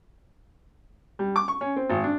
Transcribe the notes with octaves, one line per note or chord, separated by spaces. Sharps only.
G3
D6
C#6
C#4
C4
G#1
D4